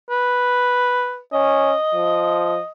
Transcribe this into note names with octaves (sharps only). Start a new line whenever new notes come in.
B4
C#4 D#5
F3